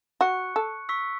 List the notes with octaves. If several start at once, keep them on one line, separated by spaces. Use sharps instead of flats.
F#4 C#6 F#6 C#7
A4
C#6 E6 B6